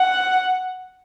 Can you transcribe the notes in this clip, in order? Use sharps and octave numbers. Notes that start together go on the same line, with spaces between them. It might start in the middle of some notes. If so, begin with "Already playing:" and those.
Already playing: F#5